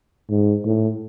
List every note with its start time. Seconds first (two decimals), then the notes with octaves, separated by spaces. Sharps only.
0.30 G#2
0.65 A2